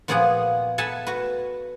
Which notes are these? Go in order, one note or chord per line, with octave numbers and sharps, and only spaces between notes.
A#2 F3 B3 F4 G#4 F#5
A4 E5 F#5 G#5 A5 B5
F#4 B4